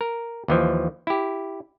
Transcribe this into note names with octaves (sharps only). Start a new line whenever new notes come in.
A#4
D#2 E3 F3
E4 G4